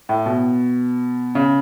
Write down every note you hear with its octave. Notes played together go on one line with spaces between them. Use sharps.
A2
B2
C#3